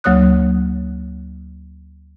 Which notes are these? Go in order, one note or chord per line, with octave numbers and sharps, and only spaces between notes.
D2 F#3 A#3 C#5 D#6 F#6